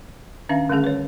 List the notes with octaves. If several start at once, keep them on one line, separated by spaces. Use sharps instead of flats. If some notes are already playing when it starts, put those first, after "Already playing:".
D#3 C#4 D4 E5 F5
D3 G3 A3 C#4 G#4
B4 C#5